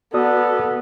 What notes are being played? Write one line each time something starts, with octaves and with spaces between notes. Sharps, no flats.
B3 F#4 A4 D5 D#6